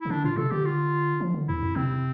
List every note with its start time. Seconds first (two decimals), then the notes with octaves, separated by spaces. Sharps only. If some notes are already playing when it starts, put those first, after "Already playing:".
0.01 C3 E4
0.10 D3 D4
0.24 A#2 F4
0.37 C3 A4
0.51 D3 G4
0.65 F4
1.20 F3
1.34 D3
1.48 E2 E4
1.62 F2
1.76 C3 C4